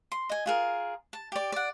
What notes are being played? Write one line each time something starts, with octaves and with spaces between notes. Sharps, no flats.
C6
D#5 G#5
F4 G#4 A#4
A5
G4 D5
D5 F#5